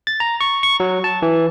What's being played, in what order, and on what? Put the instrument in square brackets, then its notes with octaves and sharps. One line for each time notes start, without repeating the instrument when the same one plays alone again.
[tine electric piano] A6
A#5
C#6
C#6
F#3
A5
E3